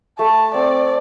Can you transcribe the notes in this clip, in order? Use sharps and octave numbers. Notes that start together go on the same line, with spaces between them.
A3 A5
C4 D5